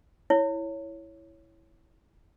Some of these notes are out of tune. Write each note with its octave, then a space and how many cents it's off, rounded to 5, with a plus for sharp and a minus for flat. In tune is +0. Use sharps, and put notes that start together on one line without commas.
E4 +0 C#5 +0